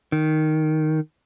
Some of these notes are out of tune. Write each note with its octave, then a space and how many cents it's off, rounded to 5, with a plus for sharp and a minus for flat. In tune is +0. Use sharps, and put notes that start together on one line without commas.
D#3 +0